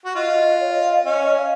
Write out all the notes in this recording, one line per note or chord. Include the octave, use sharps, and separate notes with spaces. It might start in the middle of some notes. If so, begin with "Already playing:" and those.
F#4
F4 D#5
C#5
D#5
F5
D#5
C#4 D#5
C#5
D#5
F5